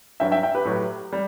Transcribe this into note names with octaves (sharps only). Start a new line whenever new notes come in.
G2 F#3 E5 G5
E5 G5
E5 G5
G4 B4
A2 F#3
G3